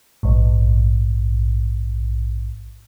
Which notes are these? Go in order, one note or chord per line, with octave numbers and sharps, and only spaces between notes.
A#1 G#2